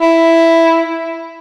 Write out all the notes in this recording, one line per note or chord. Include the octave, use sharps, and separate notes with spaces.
E4